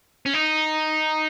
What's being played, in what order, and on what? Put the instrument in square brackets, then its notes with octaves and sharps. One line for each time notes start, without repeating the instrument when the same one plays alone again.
[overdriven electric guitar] C#4
D#4